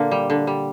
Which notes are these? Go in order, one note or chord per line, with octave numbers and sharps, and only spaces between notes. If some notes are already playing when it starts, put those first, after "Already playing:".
Already playing: A#2 D3 A#3
G3
D3
G3